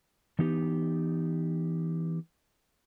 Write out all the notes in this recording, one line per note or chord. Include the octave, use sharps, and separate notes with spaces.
E3 B3 D#4 G4